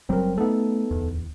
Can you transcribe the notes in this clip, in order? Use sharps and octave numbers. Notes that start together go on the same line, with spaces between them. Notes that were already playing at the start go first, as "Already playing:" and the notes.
F#1 F#3 G3 C4 A#4
A3 B3 D#4 A4
D1 E2